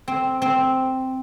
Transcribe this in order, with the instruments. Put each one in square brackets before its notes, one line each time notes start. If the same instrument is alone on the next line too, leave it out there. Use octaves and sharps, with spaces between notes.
[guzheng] C4
C4